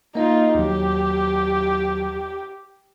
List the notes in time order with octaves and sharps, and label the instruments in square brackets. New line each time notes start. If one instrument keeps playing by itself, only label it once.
[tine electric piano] A#3 D#5 [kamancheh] D#4 F4
[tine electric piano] D#2 F#3 [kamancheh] G4